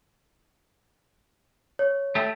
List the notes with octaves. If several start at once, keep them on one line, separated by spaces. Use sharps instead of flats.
C#5
A3 G4